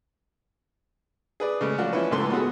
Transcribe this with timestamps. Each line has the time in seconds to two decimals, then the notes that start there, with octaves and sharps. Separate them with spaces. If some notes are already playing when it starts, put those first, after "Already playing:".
1.40 G#4 B4 D5
1.61 C#3 G#3 A3
1.78 F3 F#3 F#4 D5 F5
1.93 E3 F3 C#4 E4 B4
2.11 C#2 G#2 A3 B4 C6
2.31 B3 F#4 G#4 A4